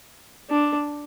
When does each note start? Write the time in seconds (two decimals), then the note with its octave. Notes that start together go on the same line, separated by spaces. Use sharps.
0.50 D4